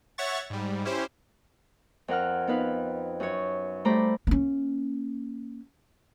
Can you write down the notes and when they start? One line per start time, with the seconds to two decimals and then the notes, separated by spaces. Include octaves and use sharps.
0.18 C#5 E5 F#5 C#6 A6
0.50 G#2 G3
0.85 C#4 E4 G4 C5
2.08 F2 A#4 F#5 F6
2.47 B3 D#4 B4 F5
3.20 F#2 C#5
3.85 G3 A3 C5 A#5 B5 D6
4.27 A#3 C#4